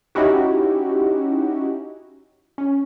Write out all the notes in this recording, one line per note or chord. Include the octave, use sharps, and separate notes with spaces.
C#4 D#4 E4 F#4 G4
C#4